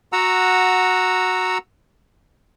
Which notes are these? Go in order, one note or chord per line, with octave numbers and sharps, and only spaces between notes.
F#4 F#5 A#5 E6